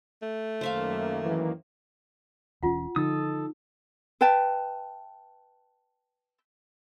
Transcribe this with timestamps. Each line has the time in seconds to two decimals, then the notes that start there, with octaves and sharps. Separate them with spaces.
0.22 A3
0.61 F#2 D#3 A#3 C5 E5 F5
1.25 E3
2.63 E1 E3 C#4 F4 F#5
2.96 D3 F3 D#4 A4 D#6
4.21 B4 E5 G5 A5